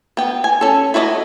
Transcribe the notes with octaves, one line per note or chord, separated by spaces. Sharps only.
B3 G5
G#5
C#4 A4
E4 F#4 B4 C#5 D#5